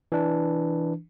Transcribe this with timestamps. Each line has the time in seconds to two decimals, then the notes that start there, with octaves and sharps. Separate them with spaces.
0.12 E3 D4